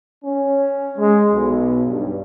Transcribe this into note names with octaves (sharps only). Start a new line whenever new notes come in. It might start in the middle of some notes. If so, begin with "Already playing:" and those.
C#4
G#3
B1
G2